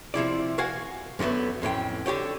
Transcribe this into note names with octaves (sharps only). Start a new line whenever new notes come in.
C3 F3 E4 D5
F#4 A#4 F5 F#5 G#5
F#2 D3 F#3 A3 B3
F2 A2 C#4 G5
D3 G4 C#5 G5